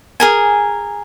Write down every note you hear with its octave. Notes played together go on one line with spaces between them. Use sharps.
G#4 A#4 G#5